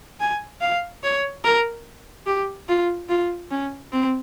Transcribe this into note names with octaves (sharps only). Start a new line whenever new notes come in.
G#5
F5
C#5
A#4
G4
F4
F4
C#4
C4